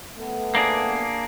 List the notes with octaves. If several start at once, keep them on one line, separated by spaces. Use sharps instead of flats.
A3 B3
A#3 D4 G#4